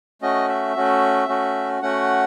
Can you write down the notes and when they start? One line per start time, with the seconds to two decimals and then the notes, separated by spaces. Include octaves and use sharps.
0.22 A3 C#4 F#4 D#5
0.49 E5
0.76 A3 C#4 F#4
1.28 A3 C#4 F#4
1.82 A3 C#4 F#4 F#5